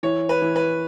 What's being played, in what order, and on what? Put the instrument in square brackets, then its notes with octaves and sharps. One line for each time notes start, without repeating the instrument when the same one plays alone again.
[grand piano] E3 [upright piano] C#5
[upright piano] B4
[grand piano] E3
[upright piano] B4